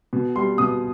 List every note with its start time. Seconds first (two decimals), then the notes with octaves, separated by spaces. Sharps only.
0.13 B2
0.36 G3 C6
0.58 B2 D#6